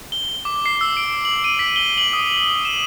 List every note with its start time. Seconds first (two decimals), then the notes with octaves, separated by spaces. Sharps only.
0.12 G7
0.45 D6
0.66 C7
0.81 E6
0.97 D7
1.25 F#7
1.44 D#7
1.59 B6
1.76 G7
1.98 F#7
2.13 D#6
2.65 E7